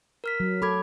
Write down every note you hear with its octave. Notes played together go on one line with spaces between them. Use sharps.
A#4 F6 B6
F#3
A4 B5 D6 G#6